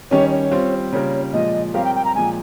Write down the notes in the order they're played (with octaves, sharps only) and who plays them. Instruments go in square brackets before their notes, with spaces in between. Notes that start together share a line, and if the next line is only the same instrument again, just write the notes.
[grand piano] D#3 G3 C#4 G4 [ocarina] C#5
[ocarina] C#5
[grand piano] G3 C4 F4 C5
[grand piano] C#3 G3 A#3 F4 A#4 [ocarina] C#5
[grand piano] A#2 F3 G#3 [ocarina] D#5
[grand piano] G3 C4 G4 A#4 C#5 [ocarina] F5
[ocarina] G5
G5
A#5
[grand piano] A#2 F3 G#3 [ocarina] G#5